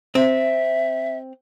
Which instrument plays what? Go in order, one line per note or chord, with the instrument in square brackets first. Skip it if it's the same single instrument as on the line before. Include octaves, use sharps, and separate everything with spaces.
[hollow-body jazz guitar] C4 [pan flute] E5